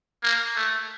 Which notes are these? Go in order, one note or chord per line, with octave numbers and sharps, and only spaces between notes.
A#3
A3